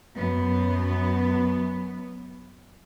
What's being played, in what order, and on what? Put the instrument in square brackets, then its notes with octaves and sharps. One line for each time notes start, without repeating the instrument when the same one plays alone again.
[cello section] F#2 B3